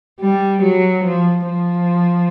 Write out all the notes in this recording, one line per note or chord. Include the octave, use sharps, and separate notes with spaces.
G3
F#3
F3
F3